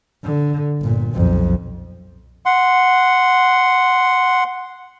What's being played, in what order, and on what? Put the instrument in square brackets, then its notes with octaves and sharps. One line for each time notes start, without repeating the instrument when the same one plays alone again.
[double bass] D3
G1 A#2
B1 F2
[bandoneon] F#5 C6